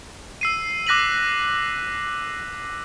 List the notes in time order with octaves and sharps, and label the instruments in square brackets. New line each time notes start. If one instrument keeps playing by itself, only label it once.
[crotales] E6 C7 D#7
D6 F#6 A#6 B6 D#7 F#7